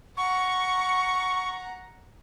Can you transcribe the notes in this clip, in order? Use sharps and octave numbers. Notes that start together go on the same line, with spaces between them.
F#5 A#5 C#6